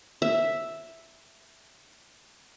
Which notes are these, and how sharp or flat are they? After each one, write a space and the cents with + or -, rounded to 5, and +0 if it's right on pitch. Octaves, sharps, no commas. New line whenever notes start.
E5 +0